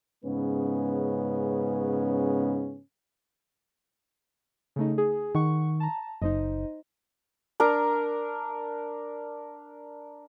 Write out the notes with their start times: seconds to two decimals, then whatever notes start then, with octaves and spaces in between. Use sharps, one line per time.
0.24 G#2 C#3 B3 C#4 B4
4.76 C#3 A3 D#4
4.98 G#4
5.35 D#3 F#5 C#6
5.80 A5 A#5
6.22 F#1 D#4 C5 D#5
7.60 D4 A#4 A#5